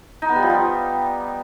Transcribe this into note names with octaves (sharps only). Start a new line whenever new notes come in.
D#4
B3
G3
F3
G3